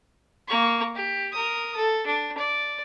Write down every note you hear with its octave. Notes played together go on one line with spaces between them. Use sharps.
A#3 C#6
G4
A#4 D#6
A4
D4
D5